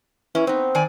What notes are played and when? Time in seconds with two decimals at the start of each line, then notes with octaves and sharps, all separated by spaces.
0.35 E3 C#4 E4
0.47 B3 C4 D#4
0.75 D#3 D5 G#5